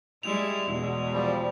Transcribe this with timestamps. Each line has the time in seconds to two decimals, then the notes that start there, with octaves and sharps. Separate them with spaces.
0.23 G3 G#3 E4 F7
0.69 E2 B2 G#3
1.13 F3 G3